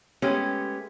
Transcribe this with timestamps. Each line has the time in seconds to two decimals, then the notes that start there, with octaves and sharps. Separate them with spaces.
0.22 G#3 A3 B3 C#4 G4